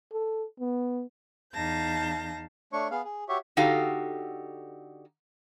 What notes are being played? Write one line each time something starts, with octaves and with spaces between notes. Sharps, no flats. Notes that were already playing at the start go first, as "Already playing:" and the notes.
A4
B3
E2 D#4 F5 A5 G6 A#6
A3 D4 C#5 C#6
B3 G#4 F5
G#4
F#4 G4 C#5 E5
D3 D#4 F#4 G4 A4 F5